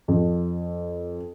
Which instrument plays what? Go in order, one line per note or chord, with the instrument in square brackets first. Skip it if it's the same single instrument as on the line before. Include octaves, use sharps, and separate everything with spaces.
[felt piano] F2